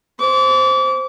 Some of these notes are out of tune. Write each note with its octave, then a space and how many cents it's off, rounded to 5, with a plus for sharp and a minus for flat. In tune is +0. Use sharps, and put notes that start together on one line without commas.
C5 +0 D6 -35